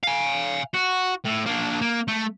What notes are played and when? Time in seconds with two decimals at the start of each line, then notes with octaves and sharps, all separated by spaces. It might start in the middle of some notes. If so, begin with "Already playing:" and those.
0.04 F5 G#5
0.74 F#4
1.25 A2
1.46 A#3 D4
1.81 A#3
2.08 A3